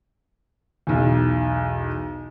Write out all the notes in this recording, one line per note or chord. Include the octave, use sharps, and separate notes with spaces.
B1 E2